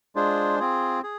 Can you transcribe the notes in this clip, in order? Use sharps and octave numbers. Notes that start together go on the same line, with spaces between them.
G#3 D4 F4 G#4 C5
C4 F4 G#4
G#4